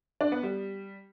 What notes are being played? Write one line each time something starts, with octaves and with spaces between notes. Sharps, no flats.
D4
B3
G3